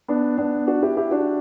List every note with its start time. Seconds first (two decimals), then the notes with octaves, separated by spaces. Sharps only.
0.08 B3 D4
0.38 B3 D4
0.67 D4 F#4
0.83 E4 G4
0.97 E4 G4
1.11 D4 F#4